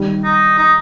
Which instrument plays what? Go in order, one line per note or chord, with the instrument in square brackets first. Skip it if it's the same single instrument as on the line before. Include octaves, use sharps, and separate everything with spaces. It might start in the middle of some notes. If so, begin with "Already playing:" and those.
Already playing: [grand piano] D#3 G3
[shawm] D#4
D#4